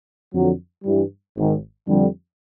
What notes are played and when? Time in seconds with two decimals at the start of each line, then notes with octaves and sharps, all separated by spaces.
0.33 F2 D3 F#3
0.85 G2 E3 G3
1.36 G#1 G#2 D#3
1.88 F2 D3 G3